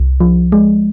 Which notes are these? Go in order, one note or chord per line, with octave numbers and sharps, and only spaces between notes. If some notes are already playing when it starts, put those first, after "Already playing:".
Already playing: C2
F3
G#3